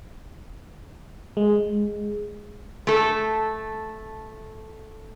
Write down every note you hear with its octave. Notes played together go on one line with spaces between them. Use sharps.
G#3
A3 A4